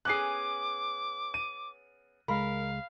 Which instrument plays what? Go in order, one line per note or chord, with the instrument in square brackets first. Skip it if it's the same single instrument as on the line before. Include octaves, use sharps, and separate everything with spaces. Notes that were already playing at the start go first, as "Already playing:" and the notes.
[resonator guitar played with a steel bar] B3 C#4 G#4 [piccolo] D6 [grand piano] F#6 C7
[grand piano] D#7
[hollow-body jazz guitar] C#2 G#3 [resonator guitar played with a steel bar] A#4 [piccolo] F5 [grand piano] B5